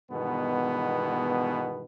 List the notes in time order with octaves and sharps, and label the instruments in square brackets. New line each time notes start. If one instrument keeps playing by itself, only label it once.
[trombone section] G2 B2 D#3 E3 G#3 B3